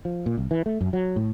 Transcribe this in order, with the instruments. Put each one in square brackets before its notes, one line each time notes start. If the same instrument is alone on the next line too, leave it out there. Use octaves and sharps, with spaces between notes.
[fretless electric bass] F3
A#2
C2
E3
A3
F#2
F#3
A2